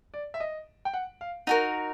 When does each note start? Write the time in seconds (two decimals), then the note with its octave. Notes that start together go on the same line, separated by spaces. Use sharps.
0.14 D5
0.34 E5
0.40 D#5
0.85 G5
0.94 F#5
1.21 F5
1.47 D#4 F#4 A#4 F#5